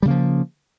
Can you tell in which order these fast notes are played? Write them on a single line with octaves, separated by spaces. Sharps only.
G3 C#3 A#3 F3